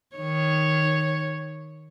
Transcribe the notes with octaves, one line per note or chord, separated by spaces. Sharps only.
D#3 C#5